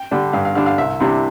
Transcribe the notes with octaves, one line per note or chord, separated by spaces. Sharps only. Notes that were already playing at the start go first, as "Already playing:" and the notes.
Already playing: G5
D3 G3 D4
G2 F5
F5
D3 G3 D4 F5
F5
C2 E5
C3 E3 G3 D4